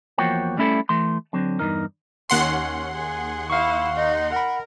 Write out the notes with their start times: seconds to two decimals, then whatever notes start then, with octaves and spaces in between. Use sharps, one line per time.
0.18 E2 F3 A#3 F#4 C#5 G5
0.57 G3 A3 C#4 E4 G4 A4
0.89 E3 A3 C6
1.33 D3 F#3 C4
1.59 E2 G2 C3 D#4 A#4
2.30 D#2 C#4 F#5 C6
2.94 G#4
3.50 E4 F5 C#6
3.95 D#4
4.32 A#4 F#5 B5